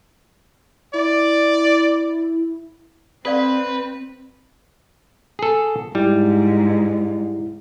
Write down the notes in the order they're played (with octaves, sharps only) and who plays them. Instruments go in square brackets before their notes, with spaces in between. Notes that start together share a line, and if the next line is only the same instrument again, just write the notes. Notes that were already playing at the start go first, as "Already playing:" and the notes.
[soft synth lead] E4 [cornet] D5
[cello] C4 [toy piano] A4 D5 F5 [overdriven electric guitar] B4
[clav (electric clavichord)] G#4 A4
[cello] G#2 [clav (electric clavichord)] G3 [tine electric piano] E4